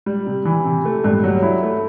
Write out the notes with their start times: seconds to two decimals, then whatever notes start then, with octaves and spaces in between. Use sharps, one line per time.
0.06 G3
0.26 C3
0.45 E3
0.65 C3
0.85 A3
1.04 G2
1.24 F#3
1.43 E4
1.63 A3